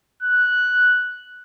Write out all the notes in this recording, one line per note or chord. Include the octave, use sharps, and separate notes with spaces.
F#6